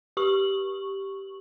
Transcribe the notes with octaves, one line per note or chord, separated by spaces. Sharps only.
G4 C#6 F#7